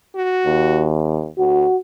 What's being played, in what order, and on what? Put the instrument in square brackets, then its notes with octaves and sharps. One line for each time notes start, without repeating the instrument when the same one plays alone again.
[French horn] F#4
[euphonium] D#2
[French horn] D2 [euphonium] F#4